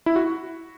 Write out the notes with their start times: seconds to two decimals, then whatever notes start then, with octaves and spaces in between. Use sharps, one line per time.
0.06 E4
0.16 F#4